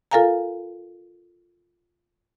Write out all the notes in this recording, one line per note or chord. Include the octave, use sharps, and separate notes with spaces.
F4 A4 A#4 F5 G#5 A#5